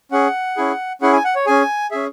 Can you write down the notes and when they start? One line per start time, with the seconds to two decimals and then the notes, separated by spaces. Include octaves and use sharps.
0.11 C#4 G#4 F#5
0.57 C#4 E4 G#4
1.01 C#4 E4 G#4 F#5
1.13 G#5
1.24 F#5
1.36 C#5
1.46 C#4 G#4 G#5
1.91 C#4 G#4 E5